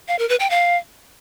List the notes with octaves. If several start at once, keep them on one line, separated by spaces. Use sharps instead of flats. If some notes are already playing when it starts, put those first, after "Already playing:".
F5
A#4
B4
G5
F5